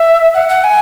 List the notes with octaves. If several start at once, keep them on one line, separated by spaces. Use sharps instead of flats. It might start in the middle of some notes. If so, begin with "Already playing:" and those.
Already playing: E5
F#5
F#5
G#5